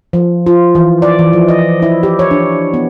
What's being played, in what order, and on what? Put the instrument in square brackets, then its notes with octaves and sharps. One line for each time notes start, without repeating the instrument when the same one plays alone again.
[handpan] F3
F4
E3
D5
E3
F3
D#5
E4
G4
C#5
D4
B3